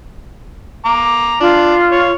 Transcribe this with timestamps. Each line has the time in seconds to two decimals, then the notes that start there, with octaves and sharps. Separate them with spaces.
0.85 A#5 D6
1.41 D4 F4
1.92 C#5